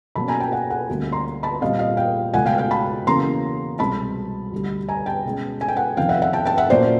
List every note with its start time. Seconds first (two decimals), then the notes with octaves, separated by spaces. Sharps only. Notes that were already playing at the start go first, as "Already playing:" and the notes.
0.15 B2 F#3 A#3 C#4 A5 B5
0.28 G#5 A#5
0.40 G5 A5
0.52 F#5 G#5
0.70 F#5 G#5
0.89 D2 D3 G3 A#3 C#4
1.12 A#5 C6
1.43 A5 B5
1.61 A#2 G3 C4 D#5 F5
1.79 D#5 F5
1.97 F5 G5
2.34 C#2 B2 F#3 A3 F#5 G#5
2.46 F5 G5
2.58 F5 G5
2.71 A5 B5
3.07 E2 C#3 F#3 A#3 C#4 A#5 C6
3.79 C2 B2 G#3 C4 A5 B5
4.52 D2 D3 G3
4.89 G#5 A#5
5.06 G5 A5
5.25 B2 G#3 C#4
5.61 G#5
5.68 G5
5.76 F#5 G#5
5.97 F2 C3 D#3 F5 G5
6.09 E5 F#5
6.22 E5 F#5
6.33 G5 A5
6.45 G5 A5
6.58 E5 F#5
6.70 A#2 F#3 A#3 C#4 C5 D5